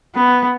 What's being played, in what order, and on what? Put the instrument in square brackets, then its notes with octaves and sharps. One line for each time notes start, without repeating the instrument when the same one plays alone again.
[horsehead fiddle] B3